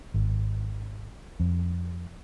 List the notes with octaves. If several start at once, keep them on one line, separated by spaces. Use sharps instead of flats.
G#1
F2